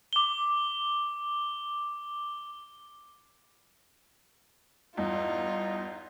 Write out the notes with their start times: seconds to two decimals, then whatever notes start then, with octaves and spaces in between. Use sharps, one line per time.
0.13 D6 G7
4.97 E2 G2 D#4 F4